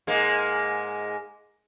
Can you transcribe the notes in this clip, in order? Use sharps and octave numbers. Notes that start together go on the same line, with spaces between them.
G#2 G#3 A#3